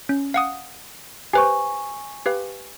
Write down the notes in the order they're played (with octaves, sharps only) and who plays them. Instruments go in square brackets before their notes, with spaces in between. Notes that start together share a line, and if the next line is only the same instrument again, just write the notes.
[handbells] C#4
F5 F#5 D#6
[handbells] G4 B4 C5 [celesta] G#5 C#6
[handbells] G4 B4 F5